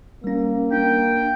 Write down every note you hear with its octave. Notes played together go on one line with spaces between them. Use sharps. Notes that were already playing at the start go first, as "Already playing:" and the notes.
G3 A#3 C#4
D4 G5